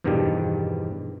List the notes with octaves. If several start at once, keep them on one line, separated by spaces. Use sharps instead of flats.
E2 G2 B2 D#3 F3 G3